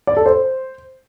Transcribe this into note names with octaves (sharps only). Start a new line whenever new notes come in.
D5
A4
C5